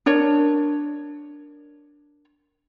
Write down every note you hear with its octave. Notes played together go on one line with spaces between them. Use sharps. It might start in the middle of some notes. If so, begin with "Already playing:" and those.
D4 A#4 C#5